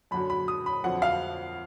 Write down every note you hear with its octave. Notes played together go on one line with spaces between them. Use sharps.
F#2 D3 F#3 B5
B5
D#6
B5
F2 D3 F#3 F#5
F5